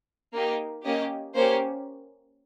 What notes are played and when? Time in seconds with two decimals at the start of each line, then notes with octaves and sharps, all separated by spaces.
0.34 A#3 D#4 G4
0.84 A#3 C#4 G4 D#5
1.35 A#3 C#4 G4 C5